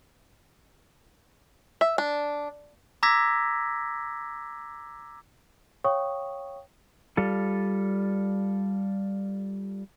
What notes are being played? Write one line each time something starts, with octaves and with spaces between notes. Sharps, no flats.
E5
D4
A#5 D6 E6 G#6 A#6 B6
C#5 F5 G5 C#6 D#6
G3 F4 A4